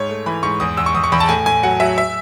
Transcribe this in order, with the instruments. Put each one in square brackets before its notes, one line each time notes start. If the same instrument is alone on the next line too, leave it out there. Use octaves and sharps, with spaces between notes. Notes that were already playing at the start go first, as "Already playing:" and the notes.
Already playing: [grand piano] G#2 C#5
A3
E3 B5
G#2 C#6
E2 D#6
E2 E6
C#6
E2 D#6
C#6
E2 B5
A5
A2 G#5
A2 G#5
F#3 F#5
F#3 E5
E5